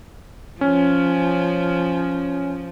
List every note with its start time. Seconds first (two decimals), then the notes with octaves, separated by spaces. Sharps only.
0.61 F3 C#4